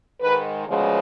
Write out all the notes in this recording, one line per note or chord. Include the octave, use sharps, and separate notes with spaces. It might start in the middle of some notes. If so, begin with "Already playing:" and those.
G#2 D#3 G#3 B4
D2 C#3 F3 G#3 B3